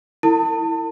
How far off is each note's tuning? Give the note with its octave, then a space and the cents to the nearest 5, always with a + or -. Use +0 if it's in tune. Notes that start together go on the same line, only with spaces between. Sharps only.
E4 +0 A#4 -45 A5 +30